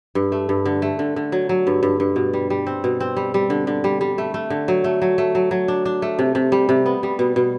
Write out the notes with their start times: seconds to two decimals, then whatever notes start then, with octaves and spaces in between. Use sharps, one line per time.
0.15 G2
0.32 A3
0.49 G2
0.65 D3
0.82 A3
0.99 D3
1.16 D3
1.32 F#3
1.49 F#3
1.67 G2
1.83 G2
2.00 G2
2.16 B2
2.33 G3
2.50 G3
2.67 C4
2.84 B2
3.00 C4
3.17 G3
3.34 G3
3.50 D3
3.67 D3
3.84 G3
4.01 G3
4.18 A3
4.34 A3
4.50 D3
4.68 F#3
4.84 A3
5.02 F#3
5.18 A3
5.35 F#3
5.51 F#3
5.68 D4
5.85 D4
6.02 A3
6.19 C3
6.35 C3
6.52 G3
6.69 C3
6.86 B3
7.03 G3
7.19 B2
7.36 B2